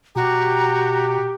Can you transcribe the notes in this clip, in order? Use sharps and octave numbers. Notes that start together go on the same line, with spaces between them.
B2 F#4 G4 A#5